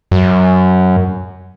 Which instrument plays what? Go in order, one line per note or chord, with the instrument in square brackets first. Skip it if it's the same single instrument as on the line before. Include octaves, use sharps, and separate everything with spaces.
[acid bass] F#2